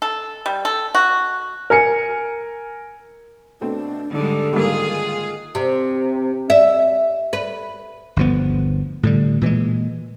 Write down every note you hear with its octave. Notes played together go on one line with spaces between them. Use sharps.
A4
G3
A4
F#4
A#4 G#5 C#7
B2 A3 C4 D4
G#2 D3 G3 G#3 A4
G#2 D#3 G3 G#3 A#3 F4 G#4
C3
E5
B4
G1 D2 F3 B3
A2 D3 G3
A#2 E3 G3 G#3